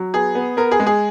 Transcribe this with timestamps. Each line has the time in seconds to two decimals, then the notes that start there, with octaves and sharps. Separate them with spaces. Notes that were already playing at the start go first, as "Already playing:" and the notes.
Already playing: F#3
0.14 B3 G#4
0.35 B3
0.57 B3 A#4
0.72 G#4
0.80 G#3
0.87 G#4